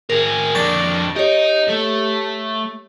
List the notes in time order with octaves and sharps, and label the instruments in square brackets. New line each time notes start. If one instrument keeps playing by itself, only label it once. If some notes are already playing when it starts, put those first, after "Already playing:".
[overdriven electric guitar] C4 G#4 [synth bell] A#4
[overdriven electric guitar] F2 D4 [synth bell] C#6 A6 A#6
[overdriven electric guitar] D#4 D#5 [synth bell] G4 C#5
[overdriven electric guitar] A3